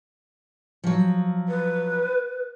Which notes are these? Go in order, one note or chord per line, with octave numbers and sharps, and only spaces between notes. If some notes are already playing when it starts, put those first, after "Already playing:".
F3 F#3
B4